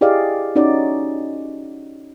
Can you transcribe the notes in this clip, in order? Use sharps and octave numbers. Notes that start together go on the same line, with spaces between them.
E4 G4 G#4 D5 D#5 F5
C#4 D#4 F#4 D5